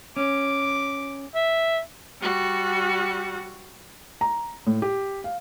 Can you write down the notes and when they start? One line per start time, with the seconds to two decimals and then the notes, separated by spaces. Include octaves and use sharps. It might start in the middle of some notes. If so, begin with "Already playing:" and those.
0.17 C#4 D6
1.35 E5
2.21 G3 F#4
4.21 A#5
4.67 A2
4.82 G4
5.24 F5